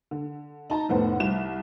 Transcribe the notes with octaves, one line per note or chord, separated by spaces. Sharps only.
D3
D#4 A5 A#5
F1 A2 B3 C5 F#5
C2 E7